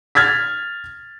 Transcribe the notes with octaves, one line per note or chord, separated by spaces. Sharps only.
F6 G#6 A6 B6